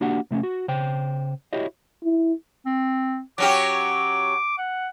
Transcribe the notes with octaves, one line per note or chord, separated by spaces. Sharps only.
A#3 D4 F#4 G4 F#5
C3 A3 C4 C#4
F#4
C#3 C5 G5
E4 F#4 G4 C#5 D#5
E4
C4
F#3 C#4 G4 D6
F#5